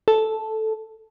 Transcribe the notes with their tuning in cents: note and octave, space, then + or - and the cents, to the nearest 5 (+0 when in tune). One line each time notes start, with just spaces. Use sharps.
A4 -5